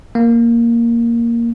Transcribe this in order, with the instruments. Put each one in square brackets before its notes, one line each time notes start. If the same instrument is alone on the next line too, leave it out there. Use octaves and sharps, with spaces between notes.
[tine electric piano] A#3